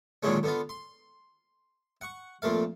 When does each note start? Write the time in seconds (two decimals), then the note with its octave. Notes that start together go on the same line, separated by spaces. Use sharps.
0.23 A#2 D3 D#3 F#3 G#3 C#4
0.43 D3 B3 F4
0.69 C6
2.01 F#5 C#6
2.42 F2 A#2 A3 F5